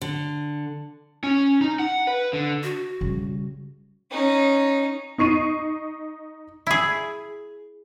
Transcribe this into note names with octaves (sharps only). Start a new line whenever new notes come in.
D3
C#4
D#4
F#5
B4
D3
F#4
C#3 G3
C#4 D#4
D#4 C#6 C7 D#7
E4 G#4